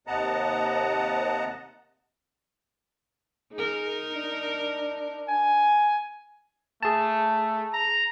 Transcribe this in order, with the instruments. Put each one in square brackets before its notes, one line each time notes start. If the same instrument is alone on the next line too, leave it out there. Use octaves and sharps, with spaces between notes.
[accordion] D#2 C3 D#5 F#5 A5 A#5
[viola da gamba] D#4 A#4 [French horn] G#4
[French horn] D4
[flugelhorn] G#5
[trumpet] A3 [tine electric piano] G#4 A5
[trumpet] A#5